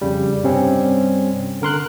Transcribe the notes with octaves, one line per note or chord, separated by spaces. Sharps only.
F2 C#3 G3
G2 C3 G3 C4 C#4
D3 A#4 C6 F#6